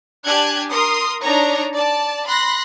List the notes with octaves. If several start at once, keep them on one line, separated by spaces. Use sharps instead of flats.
D4 G4 G#5 A5 F#6 G#6
A#4 C6 D#6
D4 D#4 C#5 A#5
D5 A5
B5 C6 F#6 A#6